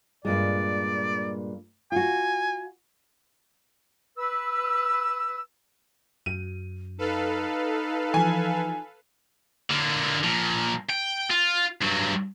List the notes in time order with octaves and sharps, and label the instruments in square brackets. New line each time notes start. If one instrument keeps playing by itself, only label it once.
[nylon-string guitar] G2 A#2 G#3 [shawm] D5
[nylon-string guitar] F4 F#4 [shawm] G#5
[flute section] B4 E6
[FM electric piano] F#2 [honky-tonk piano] D#7
[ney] D#4 [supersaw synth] A4 B4 F5
[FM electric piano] E3 F3 [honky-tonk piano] G#5
[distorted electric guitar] D3 A#3
A#2 F3
G5
F4
G2 F#3